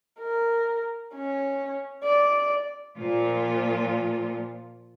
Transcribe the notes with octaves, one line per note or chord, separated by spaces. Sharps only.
A#4
C#4
D5
A#2 F3 F4